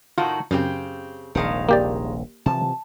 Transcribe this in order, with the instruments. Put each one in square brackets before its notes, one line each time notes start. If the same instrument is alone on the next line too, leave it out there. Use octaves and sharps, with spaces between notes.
[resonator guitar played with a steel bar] A2 D#3 F#4 [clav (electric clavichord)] F4
[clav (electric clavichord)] F#2 [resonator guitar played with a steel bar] C#3 C4 G4
[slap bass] D#1 A#1 C3 [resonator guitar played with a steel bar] D#3 G#3 F5
[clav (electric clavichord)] A#3 G4 D5
[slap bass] C3 E3 F3 [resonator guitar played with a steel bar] A5